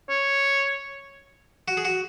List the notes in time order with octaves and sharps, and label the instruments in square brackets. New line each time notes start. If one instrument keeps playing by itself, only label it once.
[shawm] C#5
[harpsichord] F#4
G#4
F#4